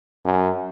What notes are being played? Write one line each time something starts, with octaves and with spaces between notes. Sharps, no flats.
F#2